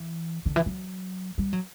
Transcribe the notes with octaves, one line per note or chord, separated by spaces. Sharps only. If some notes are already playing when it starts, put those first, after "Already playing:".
Already playing: E3
D3
E3
F#3
G3
F#3